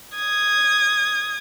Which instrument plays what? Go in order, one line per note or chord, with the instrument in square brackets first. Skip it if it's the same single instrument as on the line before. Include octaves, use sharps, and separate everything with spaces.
[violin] D#6 G#6